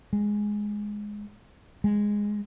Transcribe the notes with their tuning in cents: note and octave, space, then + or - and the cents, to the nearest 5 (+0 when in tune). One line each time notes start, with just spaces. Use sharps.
G#3 +0
G#3 -5